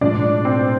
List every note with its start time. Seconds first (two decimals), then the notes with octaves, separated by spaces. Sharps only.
0.01 B1 A2 F3 G#3 D4 D5
0.45 C4 C5